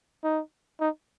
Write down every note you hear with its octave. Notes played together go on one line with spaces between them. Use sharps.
D#4
D#4